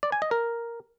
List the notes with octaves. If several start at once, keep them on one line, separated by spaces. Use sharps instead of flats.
D5
G#5
D#5
A#4